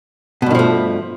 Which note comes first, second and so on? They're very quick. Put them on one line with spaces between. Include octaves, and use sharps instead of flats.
B2 G2 D#3 F3 A3